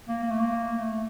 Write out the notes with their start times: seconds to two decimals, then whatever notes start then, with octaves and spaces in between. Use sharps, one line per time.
0.08 A#3
0.23 A#3
0.31 A3
0.40 A#3
0.79 A3